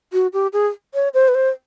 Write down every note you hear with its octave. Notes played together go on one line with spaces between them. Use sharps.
F#4
G4
G#4
C#5
C5
B4
C5